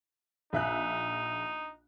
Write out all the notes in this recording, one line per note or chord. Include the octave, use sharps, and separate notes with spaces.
A#1 D#4 E5 F#6